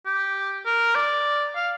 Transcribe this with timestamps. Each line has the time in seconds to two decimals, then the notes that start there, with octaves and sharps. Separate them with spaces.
0.06 G4
0.66 A#4
0.95 D5
1.56 F5